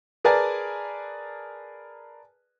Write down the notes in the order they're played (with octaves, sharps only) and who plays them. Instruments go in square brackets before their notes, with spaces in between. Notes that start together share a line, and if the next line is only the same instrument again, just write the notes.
[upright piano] G#4 A#4 B4 D5 G#5 A5